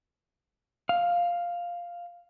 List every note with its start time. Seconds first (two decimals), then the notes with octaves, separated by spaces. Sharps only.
0.89 F5